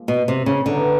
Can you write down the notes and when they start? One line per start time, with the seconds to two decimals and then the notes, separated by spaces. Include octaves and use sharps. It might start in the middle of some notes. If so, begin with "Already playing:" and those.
Already playing: A#2 F3 G#3
0.08 B2
0.28 C3
0.46 C#3
0.66 D3 E3 G3 B3 D#4